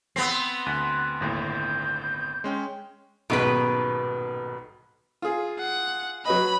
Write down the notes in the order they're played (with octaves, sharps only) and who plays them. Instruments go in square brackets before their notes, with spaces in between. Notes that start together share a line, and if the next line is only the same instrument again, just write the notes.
[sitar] B3 C4 [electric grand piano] C7
[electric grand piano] D2 [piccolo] F#6
[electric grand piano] G1 D#2 A2 [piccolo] G6
[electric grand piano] G#3 C#4 G5 [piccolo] C6
[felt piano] D#1 B1 G#2 [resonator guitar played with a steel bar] B2 D#3 B4
[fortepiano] F4 G#4
[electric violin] F#5
[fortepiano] F#3 B4 D#5 [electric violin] B5